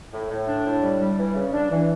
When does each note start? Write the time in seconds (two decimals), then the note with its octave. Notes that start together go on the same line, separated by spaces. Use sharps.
0.13 A2
0.30 A2
0.48 D4
0.65 A2
0.82 G3
1.00 G3
1.18 E3
1.35 C#3
1.53 D4
1.71 E3